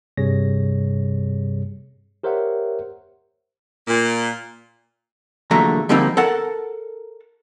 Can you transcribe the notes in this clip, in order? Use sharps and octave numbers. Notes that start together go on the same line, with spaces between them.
G2 C3 G3 G#4 C#5 A#6
G4 A#4 C5 C#5 E5 F#5
A#2
E2 A#2 D3 F#3 A3 A#5
D3 F3 G3 A#3 C4 D#4
A4 A#4 F#5 A5